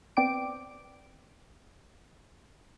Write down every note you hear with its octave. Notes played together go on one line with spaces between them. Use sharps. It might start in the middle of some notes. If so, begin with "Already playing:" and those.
B3 C4 D5 G5 D6 D7